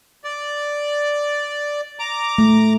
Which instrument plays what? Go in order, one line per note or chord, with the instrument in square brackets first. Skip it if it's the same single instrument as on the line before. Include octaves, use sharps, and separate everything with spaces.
[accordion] D5
A#5 D6
[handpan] A3